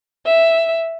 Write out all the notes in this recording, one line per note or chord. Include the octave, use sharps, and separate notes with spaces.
E5